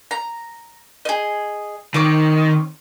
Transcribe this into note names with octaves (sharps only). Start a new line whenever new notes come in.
A#5
G#4 D#5
D#3 C4 C#5 D6